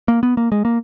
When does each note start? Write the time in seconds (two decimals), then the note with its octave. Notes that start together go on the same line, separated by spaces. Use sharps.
0.08 A#3
0.23 B3
0.37 A#3
0.52 G#3
0.65 A#3